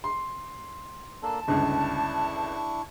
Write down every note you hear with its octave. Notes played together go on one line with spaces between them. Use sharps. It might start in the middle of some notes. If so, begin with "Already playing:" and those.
C6
A#3 D4 A4 A5
G1 C#2 D4 E4 C#6